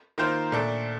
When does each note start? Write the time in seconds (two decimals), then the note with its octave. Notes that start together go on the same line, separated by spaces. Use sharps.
0.18 D#3 A#3 F4 C5
0.52 A#2 A3 D4 A4